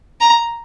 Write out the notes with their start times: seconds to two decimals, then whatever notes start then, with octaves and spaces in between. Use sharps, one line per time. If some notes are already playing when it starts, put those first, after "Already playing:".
0.21 A#5